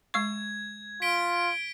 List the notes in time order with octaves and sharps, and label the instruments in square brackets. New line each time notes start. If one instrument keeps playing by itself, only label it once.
[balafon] G#3 F5 C#6 [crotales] G#6
[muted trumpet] F4 [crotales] B6 D7 G7